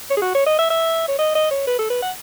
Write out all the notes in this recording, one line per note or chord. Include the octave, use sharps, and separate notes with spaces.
C#5
G#4
F#4
C#5
D#5
E5
E5
C#5
D#5
D#5
C#5
B4
A4
B4
F#5